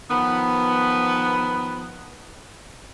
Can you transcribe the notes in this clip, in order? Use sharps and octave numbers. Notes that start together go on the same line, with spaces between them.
D#3 F3 B3